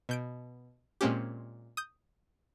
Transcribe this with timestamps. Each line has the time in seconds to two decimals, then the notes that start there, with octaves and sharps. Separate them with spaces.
0.09 B2 G6 D7
1.01 A#2 G#3 A#3 C4 C#4 G4
1.77 D#6 G6